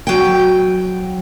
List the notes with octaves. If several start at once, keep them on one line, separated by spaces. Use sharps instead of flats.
F#3 G5